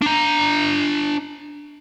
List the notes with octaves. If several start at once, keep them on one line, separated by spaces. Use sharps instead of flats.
D4 A#5